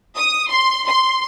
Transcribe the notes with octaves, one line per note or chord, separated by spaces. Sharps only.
D#6
C6
C6